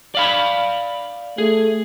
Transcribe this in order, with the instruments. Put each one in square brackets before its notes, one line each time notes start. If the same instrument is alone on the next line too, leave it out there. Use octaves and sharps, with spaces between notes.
[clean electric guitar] D5 F5 B5
[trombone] A3 [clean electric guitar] G#4